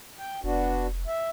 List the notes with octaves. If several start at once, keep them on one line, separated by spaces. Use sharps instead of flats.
G5
F1 B3 D4 F#4
E5